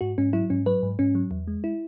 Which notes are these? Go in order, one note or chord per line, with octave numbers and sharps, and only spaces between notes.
G#2 F#4
G#2 C#4
F#3 E4
G#2 C#4
F#3 B4
G#2
G#2 C#4
F#3
E2
G#3
E4